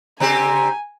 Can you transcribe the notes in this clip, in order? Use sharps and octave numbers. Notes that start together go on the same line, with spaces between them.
C#3 C4 G4 G#5 A#5